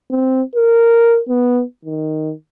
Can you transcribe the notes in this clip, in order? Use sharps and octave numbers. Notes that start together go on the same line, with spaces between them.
C4
A#4
B3
D#3